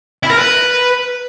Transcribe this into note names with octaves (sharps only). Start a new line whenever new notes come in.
E4
A#4
B4